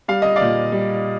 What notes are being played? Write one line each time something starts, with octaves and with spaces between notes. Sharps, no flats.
G3 F5
D#5
D5 F5
A#2
G3